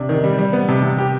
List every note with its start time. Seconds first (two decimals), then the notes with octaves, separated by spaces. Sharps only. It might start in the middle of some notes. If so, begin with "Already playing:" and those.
Already playing: C3 D4
0.09 D#3
0.24 G3
0.38 G3
0.53 B3
0.69 C3
0.83 C3
0.98 G4